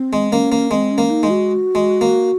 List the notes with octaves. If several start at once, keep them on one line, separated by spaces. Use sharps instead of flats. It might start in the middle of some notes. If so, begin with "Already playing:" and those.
Already playing: C4
G#3
A#3 C#4
A#3
G#3 C4
C#4
A#3
D#4
G#3
F#4
G#3
A#3